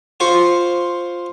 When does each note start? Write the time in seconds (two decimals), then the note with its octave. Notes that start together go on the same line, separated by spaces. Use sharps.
0.20 F4 C5 C#6